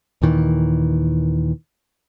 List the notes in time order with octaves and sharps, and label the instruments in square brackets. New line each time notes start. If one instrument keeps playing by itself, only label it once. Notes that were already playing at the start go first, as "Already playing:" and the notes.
[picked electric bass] D#2 A#2 D#3 E3